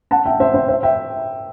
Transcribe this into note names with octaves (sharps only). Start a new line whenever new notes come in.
F#5 A5
E5 G5
C5 E5
C5 E5
C5 E5
E5 G5